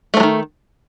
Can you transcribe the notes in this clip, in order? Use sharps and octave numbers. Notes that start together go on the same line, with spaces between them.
D#3 F3 F#3 A3